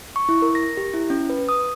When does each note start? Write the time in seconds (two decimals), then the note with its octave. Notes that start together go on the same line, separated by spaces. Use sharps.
0.16 C#6
0.29 E4
0.42 A#4
0.55 A#6
0.77 G4
0.93 E4
1.10 C#4
1.30 B4
1.49 D#6